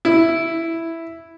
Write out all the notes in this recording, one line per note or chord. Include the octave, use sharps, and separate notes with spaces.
E4